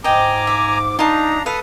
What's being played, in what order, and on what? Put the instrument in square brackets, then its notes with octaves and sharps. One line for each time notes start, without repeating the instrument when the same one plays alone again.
[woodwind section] G#2 D6 [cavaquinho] D#5 G5 [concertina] G#5 A#5
[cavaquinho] E5
[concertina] D4 A#5 [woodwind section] D#4 [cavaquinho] F4 A5
[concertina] A4 B4 D#6 [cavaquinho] F5